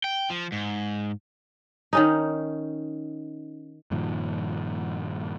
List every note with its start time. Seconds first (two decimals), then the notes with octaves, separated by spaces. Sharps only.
0.04 G5
0.30 F3
0.52 G#2
1.93 D#3 C#4 D#4
3.91 G2 A#2 D#3 F3